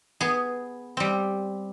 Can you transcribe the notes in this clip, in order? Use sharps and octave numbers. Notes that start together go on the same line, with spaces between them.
B3 G#4
G3 C4